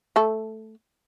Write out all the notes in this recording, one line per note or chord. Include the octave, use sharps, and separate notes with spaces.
A3 A4